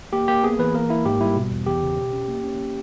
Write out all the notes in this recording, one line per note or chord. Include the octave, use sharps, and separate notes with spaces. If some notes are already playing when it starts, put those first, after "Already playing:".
A#3 G4
A#3 G4
B3 G#4
E3 B4
A#3 A#4
A#3 E4
G#2 G4
G3 E4
B2
E2
E2 G4
C#3
B2
C#4
A#3
C#4